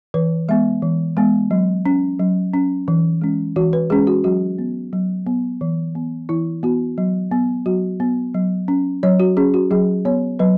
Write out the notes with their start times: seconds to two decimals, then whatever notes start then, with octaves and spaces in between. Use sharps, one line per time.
0.14 E3 B4
0.49 G#3 B3 E5
0.82 E3
1.17 G#3 B3
1.51 F#3
1.86 C#4
2.20 F#3
2.54 C#4
2.88 E3
3.21 G#3 C#4
3.56 E3 F#4
3.73 B4
3.90 G#3 C#4 G#4
4.07 F#4
4.24 F#3 F#4
4.58 B3
4.93 F#3
5.27 B3
5.61 E3
5.95 B3
6.29 E3 E4
6.63 B3 F#4
6.98 F#3
7.31 B3
7.66 F#3 F#4
8.00 B3
8.34 F#3
8.68 C#4
9.03 F#3 C#5
9.20 F#4
9.37 C#4 G#4
9.54 F#4
9.71 F#3 G#4
10.05 B3 C#5
10.39 F#3 B4